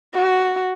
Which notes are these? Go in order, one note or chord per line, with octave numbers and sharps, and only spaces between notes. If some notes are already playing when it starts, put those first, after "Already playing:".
F#4